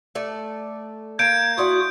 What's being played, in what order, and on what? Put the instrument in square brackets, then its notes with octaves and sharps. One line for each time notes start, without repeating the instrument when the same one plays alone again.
[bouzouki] A3 A4 D5
[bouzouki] A#3 A#4 [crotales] G6 D7 [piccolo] G#6
[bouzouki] E4 D5 F#5 [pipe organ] F#4 D#6 [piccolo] C6